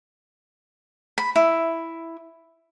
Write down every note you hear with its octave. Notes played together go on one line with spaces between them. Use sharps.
B5
E4